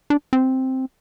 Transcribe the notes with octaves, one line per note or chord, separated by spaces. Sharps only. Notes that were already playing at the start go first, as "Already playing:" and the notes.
D4
C4